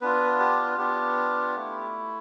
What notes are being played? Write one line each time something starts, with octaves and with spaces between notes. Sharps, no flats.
B3 D4 F4 B4
G4
B3 D4 F4 G4
A3 E4